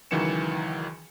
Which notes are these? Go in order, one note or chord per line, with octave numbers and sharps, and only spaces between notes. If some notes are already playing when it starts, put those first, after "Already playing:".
C#2 D#3 E3 F#3 C#7 E7